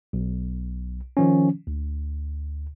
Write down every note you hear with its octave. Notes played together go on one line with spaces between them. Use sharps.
B1
D#3 F3 C#4
D2